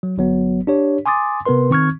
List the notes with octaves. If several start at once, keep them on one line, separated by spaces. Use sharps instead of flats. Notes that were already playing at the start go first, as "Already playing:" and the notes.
F#3
G1 F#3 B3
D4 G4 C#5
G#5 C6 D6 D#6 A6
C3 B3 A#4 B4 C6
D#3 C4 C#6 F6 G#6